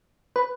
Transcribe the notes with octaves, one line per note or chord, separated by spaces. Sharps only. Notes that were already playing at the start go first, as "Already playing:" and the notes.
B4